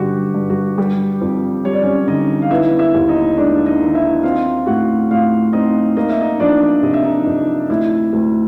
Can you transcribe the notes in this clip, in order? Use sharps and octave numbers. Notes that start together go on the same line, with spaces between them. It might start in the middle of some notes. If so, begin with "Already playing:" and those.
Already playing: G2 D3 F#4 G4
G2
F#4
G3 G4
F2
G3 C#5
D5
C#4 C#5
D3 D#4 D#5
F5
B3 E4 E5
E4 E5
D#2
D#4 D#5
G#3 D4 D5
D#4 D#5
D#3
E4 E5
C4 F4 F5
A2 F#4 F#5
A2 F4 F5
C4 D#4 D#5
A#3 D#5
E5
D#4 D#5
F3 D4 D5
C3 D#5
E5
D#4 D#5
F2
D2 E4 E5
D2